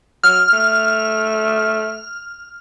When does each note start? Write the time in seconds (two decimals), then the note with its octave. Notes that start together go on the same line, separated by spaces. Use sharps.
0.24 F#3 F6
0.53 A3